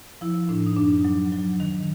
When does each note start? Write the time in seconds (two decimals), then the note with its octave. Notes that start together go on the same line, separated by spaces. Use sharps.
0.21 F3 E4
0.49 A2 D4
0.66 D#4
0.77 F#2 D4
1.04 F#3
1.32 F#3
1.60 D#3